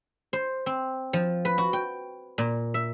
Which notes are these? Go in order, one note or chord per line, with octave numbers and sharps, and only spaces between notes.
C5
C4
F3
B4
F#4
G5
A#2
E5